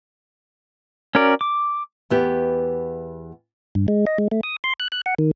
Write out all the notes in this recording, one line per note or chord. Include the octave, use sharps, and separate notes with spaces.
C#4 F#4 A#4 D5
D6
E2 B3 G4
G2
G#3
D#5
G#3
A3
D#6
C6
F#6
F#6
F#5
D#3